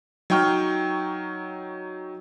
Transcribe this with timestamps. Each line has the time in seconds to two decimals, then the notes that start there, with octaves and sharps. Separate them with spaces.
0.30 F#3 D#4 G5 C#6 F6